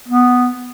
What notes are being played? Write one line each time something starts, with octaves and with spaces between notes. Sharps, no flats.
B3